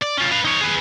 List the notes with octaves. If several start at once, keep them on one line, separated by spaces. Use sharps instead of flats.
D5
C#4 F4
B4 F5
D#4 C#5
G#4 B4